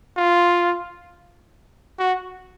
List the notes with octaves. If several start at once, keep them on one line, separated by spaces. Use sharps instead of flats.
F4
F#4